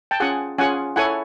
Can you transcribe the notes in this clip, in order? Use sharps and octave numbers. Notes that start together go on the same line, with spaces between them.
G5 A5
C#4 F4 G#4 F#5 G#5
C#4 F4 G#4 F#5 G#5
E4 A4 C#5 F#5 G#5